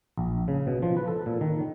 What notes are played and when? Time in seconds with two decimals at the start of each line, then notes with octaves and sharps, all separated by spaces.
0.18 A#1
0.48 C#3
0.67 B2
0.82 F3
0.97 B4
1.08 A4
1.26 A#2
1.41 D#3